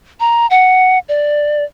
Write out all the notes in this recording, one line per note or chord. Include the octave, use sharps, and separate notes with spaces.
A#5
F#5
D5